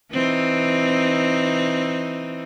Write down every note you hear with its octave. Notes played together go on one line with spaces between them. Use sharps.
E3 C4 D#4